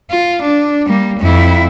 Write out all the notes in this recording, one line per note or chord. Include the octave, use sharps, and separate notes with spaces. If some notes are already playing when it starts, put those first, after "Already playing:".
F4
D4
G3 A#3
F2 E4